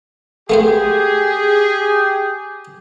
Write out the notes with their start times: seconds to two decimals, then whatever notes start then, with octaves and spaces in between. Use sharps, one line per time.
0.50 A3 B3 G4 G#4 C5